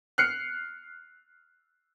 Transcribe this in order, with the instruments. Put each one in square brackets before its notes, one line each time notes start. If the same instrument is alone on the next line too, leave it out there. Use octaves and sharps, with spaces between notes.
[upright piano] F6 F#6 C7 C#7